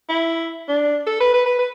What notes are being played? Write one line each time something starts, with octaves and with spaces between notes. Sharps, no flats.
E4
D4
A4
B4
B4
B4
B4